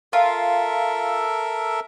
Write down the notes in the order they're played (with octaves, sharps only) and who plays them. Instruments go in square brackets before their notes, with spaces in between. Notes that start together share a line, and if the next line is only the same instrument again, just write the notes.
[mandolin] F4 [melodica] A4 A#4 E5